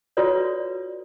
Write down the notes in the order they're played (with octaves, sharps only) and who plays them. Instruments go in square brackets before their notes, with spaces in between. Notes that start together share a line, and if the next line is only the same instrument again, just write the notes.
[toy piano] F4 F#4 A4 B4 C#5 D5